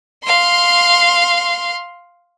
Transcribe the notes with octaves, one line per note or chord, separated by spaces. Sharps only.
F5 C6